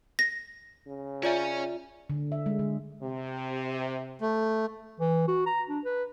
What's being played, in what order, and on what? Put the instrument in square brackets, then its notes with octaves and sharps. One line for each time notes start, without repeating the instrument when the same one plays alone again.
[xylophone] A#6
[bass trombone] C#3
[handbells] F4 D5 E5 [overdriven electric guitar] C#5 G#5
[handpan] D3
E5
G#3
D3
[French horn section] C3
[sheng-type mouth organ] A3
[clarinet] E3
F#4
A#5
D4
B4